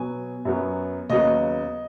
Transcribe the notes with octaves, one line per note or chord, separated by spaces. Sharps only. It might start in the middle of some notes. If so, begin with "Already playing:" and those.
Already playing: B2 F#3 B3 G#5
F#2 F#3 B3
D#2 C#3 F#3 B3 D#5